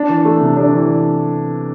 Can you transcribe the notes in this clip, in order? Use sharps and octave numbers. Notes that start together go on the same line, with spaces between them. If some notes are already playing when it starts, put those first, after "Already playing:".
Already playing: D4
E3
A3
C3
D4
E3